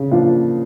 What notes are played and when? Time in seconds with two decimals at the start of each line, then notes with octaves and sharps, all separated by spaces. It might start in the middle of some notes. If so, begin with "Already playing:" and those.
Already playing: C#3
0.11 F3 A#3 D4 F4